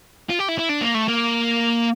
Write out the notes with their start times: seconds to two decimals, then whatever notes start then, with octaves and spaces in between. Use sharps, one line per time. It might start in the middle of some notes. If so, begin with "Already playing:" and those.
0.29 F4
0.39 G4
0.48 E4
0.58 E4
0.69 D4
0.81 A#3
0.94 A3
1.08 A#3